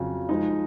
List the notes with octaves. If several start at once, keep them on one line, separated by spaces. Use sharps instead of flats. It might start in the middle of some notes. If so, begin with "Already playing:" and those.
Already playing: F2 C#3 F#3
F3 G#3 D#4